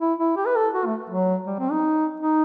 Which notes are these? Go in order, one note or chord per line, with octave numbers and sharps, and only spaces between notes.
E4
E4
G4
B4
A4
F#4
A3
F#3
G3
C4
D#4
D#4